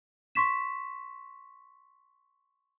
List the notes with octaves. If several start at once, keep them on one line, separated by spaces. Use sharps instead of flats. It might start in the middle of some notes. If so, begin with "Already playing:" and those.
C6 C#6 B6 E7